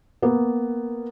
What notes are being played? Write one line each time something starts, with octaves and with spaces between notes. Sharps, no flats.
A#3 B3